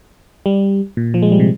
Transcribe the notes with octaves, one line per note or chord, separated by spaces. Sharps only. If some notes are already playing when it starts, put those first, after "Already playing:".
G3
A#2
F3
G#3
G3
C3